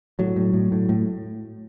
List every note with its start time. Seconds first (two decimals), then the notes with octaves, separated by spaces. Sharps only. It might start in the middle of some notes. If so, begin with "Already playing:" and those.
0.19 A2 F#3
0.36 A2
0.53 A2
0.72 A2
0.89 A2